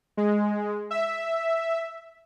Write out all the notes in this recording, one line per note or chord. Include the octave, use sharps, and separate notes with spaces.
G#3
E5